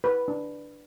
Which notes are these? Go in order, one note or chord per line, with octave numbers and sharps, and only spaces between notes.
G4 B4
D4